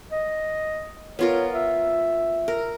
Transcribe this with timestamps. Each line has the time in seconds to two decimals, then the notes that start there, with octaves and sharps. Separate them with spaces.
0.12 D#5
1.19 B3 F4 A#4 C#5
1.54 E5
2.48 A#4